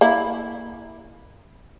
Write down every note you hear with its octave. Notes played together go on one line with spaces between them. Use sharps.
A#3 E4 B5